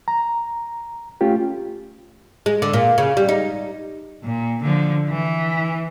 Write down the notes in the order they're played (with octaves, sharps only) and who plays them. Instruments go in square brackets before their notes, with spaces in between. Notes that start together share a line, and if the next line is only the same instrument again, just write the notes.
[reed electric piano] A#5
A3 C#4 F4 G4
[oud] G#3
D3
A#2
C#3
G3
D#4
[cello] A#2
D3 F3
E3